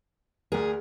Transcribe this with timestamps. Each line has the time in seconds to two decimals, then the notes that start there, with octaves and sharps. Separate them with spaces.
0.52 D2 G#4 A#4